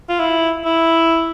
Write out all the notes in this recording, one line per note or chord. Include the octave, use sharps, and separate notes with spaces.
F4
E4
E4